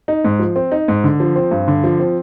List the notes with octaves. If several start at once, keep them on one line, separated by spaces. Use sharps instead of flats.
D#4
G#2
F3
C4
D#4
G#2
D3
F3
C4
G2
D3
F3
C4